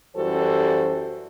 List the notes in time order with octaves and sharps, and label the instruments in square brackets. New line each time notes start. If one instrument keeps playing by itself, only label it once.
[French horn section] F#2 E3 G3 F#4 A4 C5